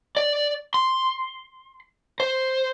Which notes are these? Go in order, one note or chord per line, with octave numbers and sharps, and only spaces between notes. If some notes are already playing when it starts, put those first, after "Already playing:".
D5
C6
C5